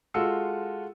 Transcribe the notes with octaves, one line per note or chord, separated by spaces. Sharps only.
G#3 F4 F#4 A4 E6 C#7